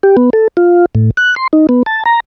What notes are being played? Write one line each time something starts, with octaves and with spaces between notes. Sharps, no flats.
G4
B3
A4
F4
A2
F#6
C6
D#4
B3
A5
A#5